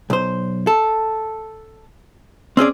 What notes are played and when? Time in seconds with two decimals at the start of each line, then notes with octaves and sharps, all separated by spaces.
0.10 B1 C5
0.67 A4
2.57 C4 C#4 G#4 D5